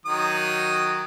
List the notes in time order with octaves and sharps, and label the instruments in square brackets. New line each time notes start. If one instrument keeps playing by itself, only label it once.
[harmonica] D#3 F#3 D#6